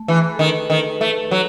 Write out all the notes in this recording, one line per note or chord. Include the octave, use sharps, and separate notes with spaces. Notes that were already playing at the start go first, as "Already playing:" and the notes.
Already playing: A3
E3 G#4
A4
D#3 B4
D#3 A4
B4
A3
B4
A4
F#3